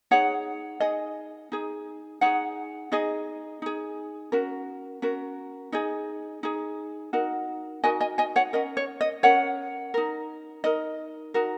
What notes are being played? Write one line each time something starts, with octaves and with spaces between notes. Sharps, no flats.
D#4 G#4 C#5 F#5
D#4 G#4 D#5
D#4 G#4
D#4 G#4 C#5 F#5
D#4 G#4 D#5
D#4 G#4
C#4 F#4 A#4
C#4 F#4 A#4
D#4 G#4 D#5
D#4 G#4
D#4 F#4 A#4
D#4 F#4 A#4 D#5 G#5
D#5 G#5
D#5 G#5
C#5 F#5
C#4 A#4 D#5
C#5
D#5
C#4 A#4 C#5 F#5
D#4 A#4
D#4 A#4 D#5
D#4 F#4 A#4